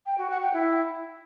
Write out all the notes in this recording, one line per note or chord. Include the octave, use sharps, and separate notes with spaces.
G5
F#4
F#5
G5
E4